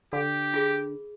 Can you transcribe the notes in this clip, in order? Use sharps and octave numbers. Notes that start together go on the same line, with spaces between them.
D3 G4
F4 G#4